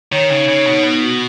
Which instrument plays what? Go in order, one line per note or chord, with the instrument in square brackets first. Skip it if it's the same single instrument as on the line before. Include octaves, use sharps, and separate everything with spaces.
[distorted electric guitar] D#3 [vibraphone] C#5
[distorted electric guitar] C#3 [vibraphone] D#4
[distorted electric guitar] C#3 [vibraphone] C#5
[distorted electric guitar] B2 [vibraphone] D#4
[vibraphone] B3
F#4